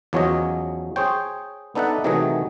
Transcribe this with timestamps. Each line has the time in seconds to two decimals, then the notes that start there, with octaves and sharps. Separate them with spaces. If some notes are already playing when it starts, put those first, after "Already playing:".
0.13 E2 F3 F#3 C#4 C#5 D#5
0.96 G#4 C5 C#5 G5
1.75 B3 D4 D#4 A4 E5 F#5
2.04 C3 D#3 E3 F#3 A3 G#4